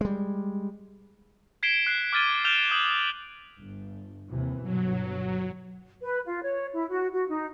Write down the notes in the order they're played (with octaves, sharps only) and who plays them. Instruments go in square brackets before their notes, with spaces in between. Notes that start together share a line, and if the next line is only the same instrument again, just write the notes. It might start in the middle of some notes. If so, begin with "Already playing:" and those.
[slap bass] G3 G#3
[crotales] G#6 B6 C7 D7 E7 G7
F#6 C7
D6 F6 G#6 A6 D#7 G7
F6 G6 D7 E7 F7 G7
D#6 G6 F#7
[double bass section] G1
D#2 C3 E3
[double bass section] G1 B2 [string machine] F#3
[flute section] B4
F4
C#5
E4
F#4
F#4
D#4